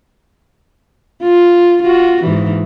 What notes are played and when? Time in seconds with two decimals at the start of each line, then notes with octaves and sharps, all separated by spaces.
1.23 F4
1.82 F4 F#4
2.24 G#2 E3